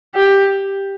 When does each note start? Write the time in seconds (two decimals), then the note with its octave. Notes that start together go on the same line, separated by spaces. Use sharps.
0.16 G4